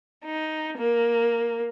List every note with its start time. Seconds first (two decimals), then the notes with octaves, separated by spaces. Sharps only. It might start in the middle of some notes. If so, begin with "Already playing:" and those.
0.25 D#4
0.77 A#3